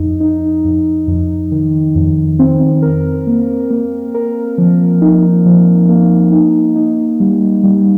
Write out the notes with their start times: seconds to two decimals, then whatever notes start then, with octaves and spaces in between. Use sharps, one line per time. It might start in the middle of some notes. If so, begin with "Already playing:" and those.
Already playing: F2 D#4
0.20 D#4
0.65 F2
1.07 F2
1.52 D#3
1.95 F2
2.39 C4
2.82 A#4
3.27 A#3
3.71 A#3
4.14 A#4
4.58 F3
5.01 D#4
5.46 F3
5.89 A#3
6.32 D#4
6.76 D#4
7.20 G3
7.63 G3